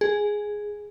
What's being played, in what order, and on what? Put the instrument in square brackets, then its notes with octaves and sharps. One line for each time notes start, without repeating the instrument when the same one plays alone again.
[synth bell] G#4